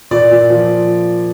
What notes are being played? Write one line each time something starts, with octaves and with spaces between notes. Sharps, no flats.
A#2 D5
A#2
F3